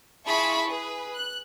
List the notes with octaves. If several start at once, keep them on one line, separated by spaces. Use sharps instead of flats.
E4 F4 G#4 A5 B5 C#6
G#4 B4
F#6